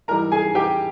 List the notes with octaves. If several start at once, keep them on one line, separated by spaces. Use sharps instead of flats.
G#2 E3 G3 A#4 A#5
G#4 G#5
G4 G5